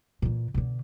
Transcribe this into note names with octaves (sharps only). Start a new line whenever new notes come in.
A#2 E3
B2 D3